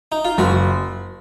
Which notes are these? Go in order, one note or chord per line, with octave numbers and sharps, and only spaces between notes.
D#4
F4
F#1 F#4